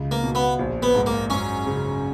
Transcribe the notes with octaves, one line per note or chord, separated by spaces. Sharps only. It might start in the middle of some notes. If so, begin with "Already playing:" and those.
Already playing: C#2
A#3
B2
B3
A#1
B3
G#2
A#3
F#2 C#4
C#3